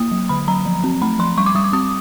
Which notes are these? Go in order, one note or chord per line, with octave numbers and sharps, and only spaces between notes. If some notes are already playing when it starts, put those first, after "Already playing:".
Already playing: A#3 D#6
F#3
D3 B5
F#3 A#5
F3
C4
A3 B5
F3 C6
G3 C#6
D6
G3 D#6
D6
C4 D#6